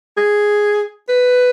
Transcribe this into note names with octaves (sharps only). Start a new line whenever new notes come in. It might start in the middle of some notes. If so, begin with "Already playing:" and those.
G#4
B4